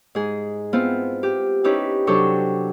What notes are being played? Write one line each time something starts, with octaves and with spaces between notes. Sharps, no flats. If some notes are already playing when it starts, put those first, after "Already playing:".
G#2 G#4
B3 C4 E4 F4
G4
C#4 D#4 E4 G4 B4
C3 F#3 D4 A4 G5 C#6